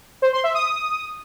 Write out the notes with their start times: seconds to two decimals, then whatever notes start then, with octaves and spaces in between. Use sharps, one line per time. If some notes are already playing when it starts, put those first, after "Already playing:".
0.22 C5
0.33 C6
0.44 E5
0.55 D#6